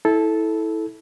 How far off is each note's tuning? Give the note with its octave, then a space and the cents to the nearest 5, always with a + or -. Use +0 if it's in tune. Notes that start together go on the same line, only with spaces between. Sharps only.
E4 -20 A4 -10